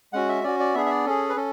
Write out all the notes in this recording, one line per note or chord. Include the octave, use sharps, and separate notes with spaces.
G#3 C#4 F#4 F#5
E5
C#4 F#4 D5
D5
B3 D4 G#4 E5
E5
D5
C#4 G#4 A4
B4
C#4 A4